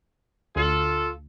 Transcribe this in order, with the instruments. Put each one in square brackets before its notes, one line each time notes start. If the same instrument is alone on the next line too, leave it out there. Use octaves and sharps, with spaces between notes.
[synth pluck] D2 [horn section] F4 A4